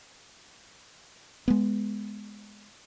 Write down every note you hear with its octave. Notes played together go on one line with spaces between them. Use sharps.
G#3 B3